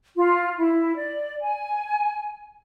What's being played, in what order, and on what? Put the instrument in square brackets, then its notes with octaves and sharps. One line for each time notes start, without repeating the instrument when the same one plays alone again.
[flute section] F4
E4
D5
G#5